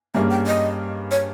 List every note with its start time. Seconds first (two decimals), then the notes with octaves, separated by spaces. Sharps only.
0.14 G2 G3 A#3 C#4 G#4 E5
0.30 G5
0.47 D#5
1.11 C#5